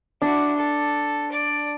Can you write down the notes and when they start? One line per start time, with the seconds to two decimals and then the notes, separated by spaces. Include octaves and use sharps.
0.22 D4 E4 F#4
0.56 A4
1.32 D5